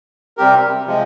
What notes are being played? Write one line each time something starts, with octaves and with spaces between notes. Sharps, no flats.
C3 G3 C4 G4 A#4
C3 F3 G#3